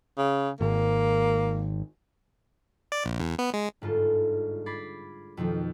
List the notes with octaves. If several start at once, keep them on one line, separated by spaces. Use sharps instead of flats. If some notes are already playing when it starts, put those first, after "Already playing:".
C#3
G#1 A#3
D5
A#1
E2
B3
G#3
G1 G#2 F4 A4
B5 D6 G#6 A6 C7
F2 B2 D#3 F3